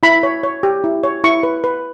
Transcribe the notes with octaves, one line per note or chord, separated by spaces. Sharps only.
E4 B5
C#5
C#5
G4
E4
C#5
E4 C#6
B4
B4